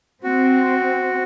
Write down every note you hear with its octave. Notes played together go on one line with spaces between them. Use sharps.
C4 F#4